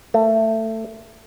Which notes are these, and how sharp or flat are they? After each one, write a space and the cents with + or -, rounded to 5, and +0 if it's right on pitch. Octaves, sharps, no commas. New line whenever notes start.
A3 +20